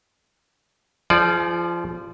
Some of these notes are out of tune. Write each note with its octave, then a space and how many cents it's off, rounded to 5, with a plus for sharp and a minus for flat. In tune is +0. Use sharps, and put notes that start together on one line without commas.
F3 -20 G#4 +35 D5 +0